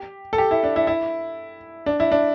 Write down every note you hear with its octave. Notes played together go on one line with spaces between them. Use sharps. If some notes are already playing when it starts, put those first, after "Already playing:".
Already playing: G4
A4
G4
E4
D4
E4
E4
D4
E4
D4